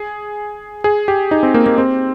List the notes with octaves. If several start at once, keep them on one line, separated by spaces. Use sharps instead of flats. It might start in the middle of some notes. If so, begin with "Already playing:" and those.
Already playing: G#4
G#4
G4
D#4
C4
A#3
A#3
C4